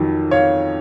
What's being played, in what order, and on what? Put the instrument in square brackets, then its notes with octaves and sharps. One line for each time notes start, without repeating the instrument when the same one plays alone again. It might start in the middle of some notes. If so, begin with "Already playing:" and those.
Already playing: [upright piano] F2 D#3 F#3
C#5 F5